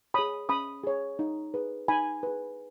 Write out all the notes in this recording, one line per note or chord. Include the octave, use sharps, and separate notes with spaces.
G#4 C#5 B5 D#6
C#4 B5 D#6
G#4 C#5
D#4
G#4 B4
D#4 G#5 B5
G#4 B4